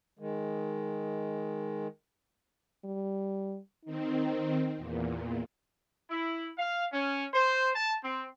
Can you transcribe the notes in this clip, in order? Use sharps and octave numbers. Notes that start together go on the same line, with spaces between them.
D#3 G#3
G3
D#3 C4 D#4
E2 A#2
E4
F5
C#4
C5
A5
C4